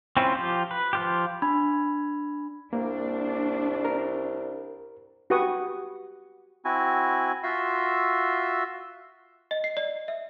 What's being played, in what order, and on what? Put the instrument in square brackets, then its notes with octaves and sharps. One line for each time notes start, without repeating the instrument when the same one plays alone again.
[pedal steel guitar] C4 C#4 E4 F4
F3 F4 G4
B4
F3 F4 G4
[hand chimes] D4 B5 G#6
[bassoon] C2 [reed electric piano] A#3 [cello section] D4
[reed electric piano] A#4
[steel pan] F#4 G4 B4 F#5 C#6 D#6
[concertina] C4 E4 F#4 G#5
F4 F#4 E5 C6 E6
[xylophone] D#5
C7
D5
E5